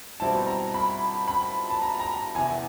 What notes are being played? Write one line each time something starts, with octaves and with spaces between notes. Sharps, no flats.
B2 G3 C4 E4 A5
A#5
B5
B5
A5
A#5
A#5
E2 C3 E3 G#5